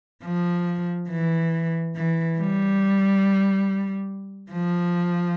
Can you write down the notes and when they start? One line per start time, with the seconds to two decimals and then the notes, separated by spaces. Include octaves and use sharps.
0.24 F3
1.09 E3
1.96 E3
2.38 G3
4.52 F3